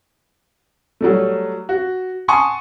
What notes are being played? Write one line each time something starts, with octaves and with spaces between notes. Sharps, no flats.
F#3 G3 A3
F#4
F#5 G#5 A5 C6 C#6 D#6